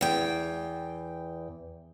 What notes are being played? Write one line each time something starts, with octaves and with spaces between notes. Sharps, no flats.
E2 G5